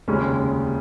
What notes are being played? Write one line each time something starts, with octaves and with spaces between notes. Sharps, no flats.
F1 D#2 C#3 G#3 C#4